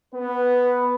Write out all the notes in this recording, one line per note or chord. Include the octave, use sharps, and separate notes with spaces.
B3 B4